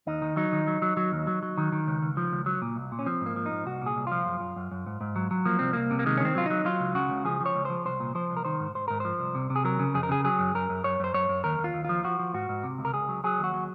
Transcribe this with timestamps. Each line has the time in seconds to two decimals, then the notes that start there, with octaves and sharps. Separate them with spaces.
0.07 D#2 D#4
0.22 D#3
0.37 F#3 D#4
0.52 D#3
0.67 F#3
0.82 F#3
0.97 F#3
1.12 D#2
1.27 F#3
1.43 F#3
1.57 D#3
1.72 D#3
1.87 C#2
2.02 C#2
2.17 F3
2.32 C#2
2.46 F#3
2.62 A#2
2.76 C2
2.92 A#2
2.99 C#4
3.06 F3 C4
3.21 G#2
3.26 A#3
3.36 F3
3.46 D#4
3.52 G#2
3.66 C2 F#4
3.82 A#2 G#4
3.96 C2
4.07 F3 F4
4.26 F#2
4.41 F#2
4.56 F#2
4.72 F#2
4.86 G#2
5.01 G#2
5.16 F#3
5.31 F#3
5.45 F3 A#3
5.59 C2 C4
5.73 C2 A#3
5.91 C3
5.99 A#3
6.06 D#3 G#3
6.17 C#4
6.20 D#3 C4
6.35 F#3 F4
6.46 F#3 D#4
6.65 F#3 F4
6.80 C#2
6.95 C#3 F#4
7.10 C#2
7.25 F3 G#4
7.40 F3
7.46 C#5
7.55 C#2
7.65 F3 C5
7.85 C2 C5
8.00 A#2
8.15 F3 C5
8.30 C2
8.37 A#4
8.45 D#3 C5
8.60 G#2
8.75 G#2 C5
8.88 G#2 A#4
9.00 F3 C5
9.20 C2
9.35 C3
9.50 C3
9.56 G#4
9.65 F#3 A#4
9.79 C#3
9.94 F2 G#4
10.03 A#4
10.09 C#3 G#4
10.24 F#3 G#4
10.39 F#2
10.55 F#2 A#4
10.70 F#2
10.84 F#2 C#5
11.00 F#2 C5
11.14 F#2 C#5
11.29 F#2
11.44 D#2 A#4
11.59 D#2
11.64 F4
11.74 D#2
11.84 F3 F4
12.04 F3 F#4
12.19 F3
12.34 G#2 F#4
12.49 G#2
12.63 C3
12.79 C#2
12.85 A#4
12.93 C#2 G#4
13.09 F#3
13.24 F#3 G#4
13.39 D#2
13.44 F#4
13.54 F#3